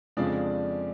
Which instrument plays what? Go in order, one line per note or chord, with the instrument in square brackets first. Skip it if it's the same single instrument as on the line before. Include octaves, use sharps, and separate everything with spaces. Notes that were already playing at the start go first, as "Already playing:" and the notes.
[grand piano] F2 C#3 F3 G#3 D4 D5